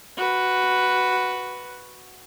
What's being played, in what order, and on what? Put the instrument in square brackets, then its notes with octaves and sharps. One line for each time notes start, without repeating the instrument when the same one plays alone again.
[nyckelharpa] F#4 B4